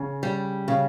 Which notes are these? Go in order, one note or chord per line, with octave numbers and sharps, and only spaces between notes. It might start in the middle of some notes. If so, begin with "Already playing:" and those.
Already playing: C#3
G3
C#3